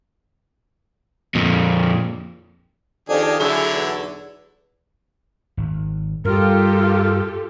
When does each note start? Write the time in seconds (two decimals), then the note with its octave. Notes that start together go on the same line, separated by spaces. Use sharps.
1.35 F2 A#2
3.09 F2 D#3 D4 G4 G#4
3.40 D3 F#3 E4 G#4
3.72 B1 E2
5.57 G#1
6.25 G2 G3 F4 G4 A4 A#4